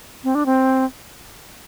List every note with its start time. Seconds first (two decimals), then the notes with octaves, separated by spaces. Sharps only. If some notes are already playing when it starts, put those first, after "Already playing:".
0.24 C4
0.35 D4
0.46 C4